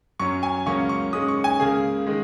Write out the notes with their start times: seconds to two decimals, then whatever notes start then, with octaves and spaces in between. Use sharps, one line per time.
0.20 F#2 F#3 C#4 C#6
0.43 G#5
0.66 C#2 C#3 F#3 A#3 C#4 C#6
0.89 C#6
1.13 G#2 G#3 C#4 D#6
1.28 C#6
1.44 G#5
1.60 C#2 C#3 A#3 G#4
2.07 D#3 G#3